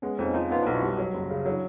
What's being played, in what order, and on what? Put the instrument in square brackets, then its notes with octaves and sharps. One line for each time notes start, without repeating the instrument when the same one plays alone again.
[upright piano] G#3 [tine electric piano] B3 C#4
[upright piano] F2 [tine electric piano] C#4 D#4
[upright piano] F3 [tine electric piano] D#4 F4
[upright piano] B3 [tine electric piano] F4
[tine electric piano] D4 E4
[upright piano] B1
[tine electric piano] E4 F#4
[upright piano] G3
F#3
F#1
C#3
[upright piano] F#3 [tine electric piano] D4 E4